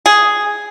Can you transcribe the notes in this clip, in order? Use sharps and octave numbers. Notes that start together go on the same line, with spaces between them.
G#4